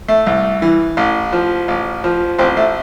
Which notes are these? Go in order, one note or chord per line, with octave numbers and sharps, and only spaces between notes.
A3
C2
E3
A1
F3
A1
F3
A1 C4
A3